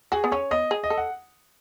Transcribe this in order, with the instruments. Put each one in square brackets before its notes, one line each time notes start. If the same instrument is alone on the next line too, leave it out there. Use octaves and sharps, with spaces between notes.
[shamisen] F#4 [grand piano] G#4
[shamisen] B3
[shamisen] C#4 [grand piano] C#5
[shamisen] B3 [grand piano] D#5
[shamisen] G#4
[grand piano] D#5
[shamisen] A4
[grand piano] F#5